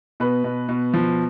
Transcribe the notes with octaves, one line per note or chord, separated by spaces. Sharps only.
B2 B4
B2
B2
F3